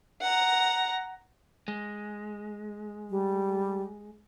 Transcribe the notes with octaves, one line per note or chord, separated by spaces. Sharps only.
F#5 A#5
G#3
G3